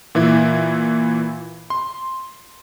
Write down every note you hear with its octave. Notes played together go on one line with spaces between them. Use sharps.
A#2 E3 E4
C6